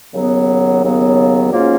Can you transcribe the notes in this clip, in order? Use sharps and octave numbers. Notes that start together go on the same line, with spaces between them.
D#2 C#3 F#3 B3
D#2 C#3 F#3 B3
G#2 F#3 A#3 C#4 F4